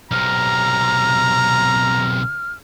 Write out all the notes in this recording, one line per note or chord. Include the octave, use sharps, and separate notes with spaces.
B1 C3 A#5 F6